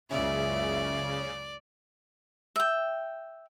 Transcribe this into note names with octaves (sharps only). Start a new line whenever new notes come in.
F#1 C#2 C#3 D5 E5
E5 G5